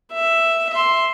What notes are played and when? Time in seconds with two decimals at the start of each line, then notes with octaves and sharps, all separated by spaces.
0.12 E5
0.71 E5 C6